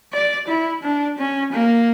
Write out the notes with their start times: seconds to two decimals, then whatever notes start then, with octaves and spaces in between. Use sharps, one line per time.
0.13 D5
0.48 E4
0.83 D4
1.18 C#4
1.53 A#3